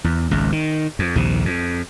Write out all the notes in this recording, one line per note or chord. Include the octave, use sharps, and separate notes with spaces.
E2
G#1 C#2
D#3
F2
A#1 D#2 C3
F2